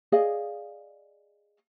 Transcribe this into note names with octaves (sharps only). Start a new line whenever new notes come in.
G#4 D5 D#5 F5